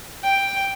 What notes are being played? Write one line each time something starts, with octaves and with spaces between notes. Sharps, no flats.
G5